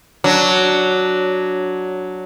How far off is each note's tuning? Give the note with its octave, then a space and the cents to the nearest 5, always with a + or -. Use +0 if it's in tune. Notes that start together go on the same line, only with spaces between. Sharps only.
F#3 +0 D4 -5